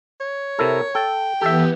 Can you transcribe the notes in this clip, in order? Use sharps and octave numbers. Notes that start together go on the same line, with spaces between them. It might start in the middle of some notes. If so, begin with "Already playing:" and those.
C#5
C3 E4 A4 A#4
A4 G5
E3 B3 G4 A4 E5